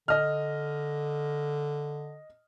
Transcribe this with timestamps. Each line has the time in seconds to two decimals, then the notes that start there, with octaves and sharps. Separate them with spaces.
0.08 D3 D#5 F6